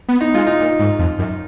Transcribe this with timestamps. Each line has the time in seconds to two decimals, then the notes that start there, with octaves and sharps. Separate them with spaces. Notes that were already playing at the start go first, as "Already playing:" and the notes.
0.08 B3
0.21 D#4
0.34 G#3 F4
0.47 D#4
0.60 A#2
0.79 G#2
0.99 F2
1.19 F#2